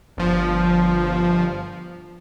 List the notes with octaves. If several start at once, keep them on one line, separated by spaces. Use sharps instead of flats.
G1 F3